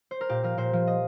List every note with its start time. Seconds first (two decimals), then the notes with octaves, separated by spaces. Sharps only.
0.11 C5
0.21 A#4
0.29 A#2 G4
0.43 F3 A#4
0.58 A#2 C5
0.73 F3
0.87 D#5